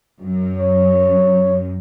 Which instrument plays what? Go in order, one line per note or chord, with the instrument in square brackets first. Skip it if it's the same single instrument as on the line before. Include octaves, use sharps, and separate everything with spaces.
[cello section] F#2
[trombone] C#5